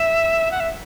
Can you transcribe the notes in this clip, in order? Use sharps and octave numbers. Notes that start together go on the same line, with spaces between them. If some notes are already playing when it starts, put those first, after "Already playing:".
Already playing: E5
F#5
E5